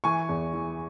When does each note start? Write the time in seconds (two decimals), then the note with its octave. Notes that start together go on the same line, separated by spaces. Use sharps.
0.04 E3 G#5 C#6
0.29 E2
0.53 E3